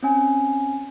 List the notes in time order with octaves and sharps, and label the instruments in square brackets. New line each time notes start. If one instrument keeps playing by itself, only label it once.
[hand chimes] C4 C#4 G#5